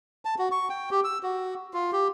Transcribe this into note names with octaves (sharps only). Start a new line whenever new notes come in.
A5
F#4
C#6
G5
G4
E6
F#4
F4
G4